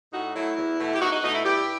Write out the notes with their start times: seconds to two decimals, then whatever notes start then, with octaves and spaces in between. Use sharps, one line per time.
0.11 A2 D#4 F#4
0.34 F#3 A3 E4
0.56 E2
0.78 B2 A3
0.93 G4
0.99 E2 D#4 F#4
1.11 D#4 F#4
1.22 B2 A3 D#4
1.32 E4
1.43 G2 E4 G4